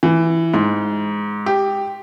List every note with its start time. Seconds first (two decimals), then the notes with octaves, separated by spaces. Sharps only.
0.03 E3
0.54 G#2
1.46 G4